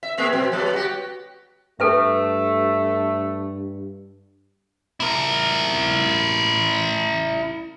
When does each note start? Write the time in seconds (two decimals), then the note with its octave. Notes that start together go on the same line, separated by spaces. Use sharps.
0.03 E5
0.18 A#3 G#4 E5
0.33 B2 F#3 C4
0.52 F#3 G3 B3
0.73 F#4 G4
1.80 G2 A3 A4 B4 E5
5.00 E4 A#4